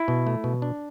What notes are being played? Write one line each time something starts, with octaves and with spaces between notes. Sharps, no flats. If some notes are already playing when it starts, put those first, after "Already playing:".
Already playing: E4
B2
A3
B2
D4